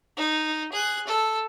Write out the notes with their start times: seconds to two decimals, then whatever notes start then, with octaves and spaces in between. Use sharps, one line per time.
0.17 D#4
0.72 G#4 F#6
1.07 A4